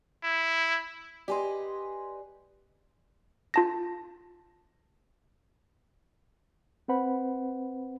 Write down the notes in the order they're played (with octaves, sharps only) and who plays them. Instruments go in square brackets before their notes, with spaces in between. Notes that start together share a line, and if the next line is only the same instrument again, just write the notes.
[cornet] E4
[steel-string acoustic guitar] G4 B4 D#5 [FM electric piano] D5 G#5 C6
[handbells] F4 A5 A#6
[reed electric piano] C4 B4 C5 F#5 B5